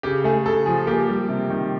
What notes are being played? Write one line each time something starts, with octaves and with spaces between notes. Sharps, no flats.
C#3 G4
A3 G#4
C#3 A4
F3 G#4
A#3 G4
G3
C3
D#3